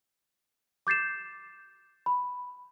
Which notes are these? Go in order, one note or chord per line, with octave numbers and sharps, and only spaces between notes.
D6 G6 A6 C7 E7
B5